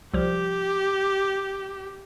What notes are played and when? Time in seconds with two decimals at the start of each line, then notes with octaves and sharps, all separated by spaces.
0.14 C2 F3 G4